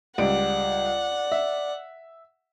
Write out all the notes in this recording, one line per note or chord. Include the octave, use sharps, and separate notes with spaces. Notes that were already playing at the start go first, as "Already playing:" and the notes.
C#2 G3 D5 F#5 D7
E5